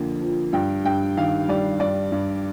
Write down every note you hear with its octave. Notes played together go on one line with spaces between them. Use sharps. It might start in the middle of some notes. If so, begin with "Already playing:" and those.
Already playing: F2 D3 A#3
F3
G2 G5
G2 G5
D#3 F5
G3 D5
G2 D5
G2